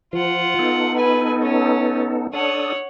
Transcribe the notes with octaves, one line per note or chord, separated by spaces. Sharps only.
F3 F4 F#5
B3 D#4 A4
B4 G#5
C#4
D4 A4 C#5 F#5 D#6